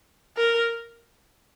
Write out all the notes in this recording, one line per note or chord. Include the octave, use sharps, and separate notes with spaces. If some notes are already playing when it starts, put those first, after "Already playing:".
A#4